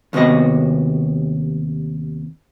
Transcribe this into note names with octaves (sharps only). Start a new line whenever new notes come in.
D#2 C3 B3 F#4 D#5